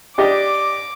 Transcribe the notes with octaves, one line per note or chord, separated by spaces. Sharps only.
D4 G4 D#5 D6